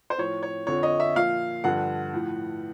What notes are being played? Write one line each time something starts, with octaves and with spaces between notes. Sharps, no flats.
C5
A2 F3 C#5
C#5
F2 D3 F3 C#5
D#5
E5
A#2 F3 F5
G2 D3 F3 F#5
A2 F3